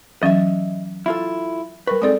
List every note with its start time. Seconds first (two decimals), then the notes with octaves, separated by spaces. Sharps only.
0.23 E3 F#3 C#4 D#5 E5
1.06 E4 F4 A4
1.87 G3 A#4 B4 C#6
2.02 G#3 C4 D#4 A4 D5 D#6